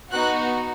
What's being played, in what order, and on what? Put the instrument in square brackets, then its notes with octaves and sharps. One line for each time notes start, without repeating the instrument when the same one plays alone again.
[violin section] B3 D#4 F#4 F#6